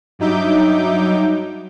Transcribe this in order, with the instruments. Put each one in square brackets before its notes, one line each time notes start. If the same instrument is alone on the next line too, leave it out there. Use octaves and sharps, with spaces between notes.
[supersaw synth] G2 F#3 D#4 E5 D6 G6